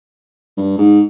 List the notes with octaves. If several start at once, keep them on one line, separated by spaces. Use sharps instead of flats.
G2
G#2